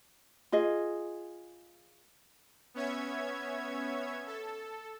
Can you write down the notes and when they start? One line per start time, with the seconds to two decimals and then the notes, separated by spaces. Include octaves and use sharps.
0.52 F4 G#4 D#5
2.74 B3 C#4 C#5 E5 G#6
4.27 A4